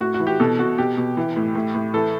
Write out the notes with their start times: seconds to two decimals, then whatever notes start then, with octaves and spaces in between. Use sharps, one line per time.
0.01 A2 F#4
0.14 F#4
0.20 E3
0.27 G4
0.40 B2 A4
0.59 B2 F#4
0.78 B2 G4
0.97 B2
1.17 E3
1.36 A2
1.55 A2
1.75 A2
1.94 E3 A4